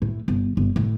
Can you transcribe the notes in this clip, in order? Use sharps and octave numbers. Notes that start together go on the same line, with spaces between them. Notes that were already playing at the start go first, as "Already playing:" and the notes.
A2
G1
G1
A2